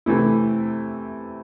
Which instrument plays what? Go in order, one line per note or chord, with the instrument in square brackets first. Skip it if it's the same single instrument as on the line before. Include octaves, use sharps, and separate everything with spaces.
[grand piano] C3 E3 A3 E4